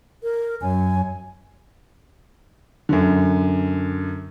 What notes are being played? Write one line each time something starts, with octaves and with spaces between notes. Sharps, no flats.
A#4
F#2 G#5
F#2 D3